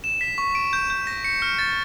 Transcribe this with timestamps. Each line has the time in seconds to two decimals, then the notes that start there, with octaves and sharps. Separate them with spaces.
0.04 E7
0.21 B6
0.38 C#6
0.55 D7
0.73 G6
0.90 G6
1.07 A#6
1.24 C#7
1.42 F6
1.59 A6